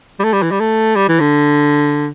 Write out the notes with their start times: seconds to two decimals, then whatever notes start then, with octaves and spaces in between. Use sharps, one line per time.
0.19 G3
0.24 A3
0.33 G3
0.43 E3
0.51 G3
0.60 A3
0.96 G3
1.08 E3
1.20 D3